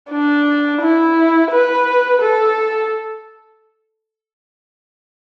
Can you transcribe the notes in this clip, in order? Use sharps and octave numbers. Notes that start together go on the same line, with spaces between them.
D4
E4
B4
A4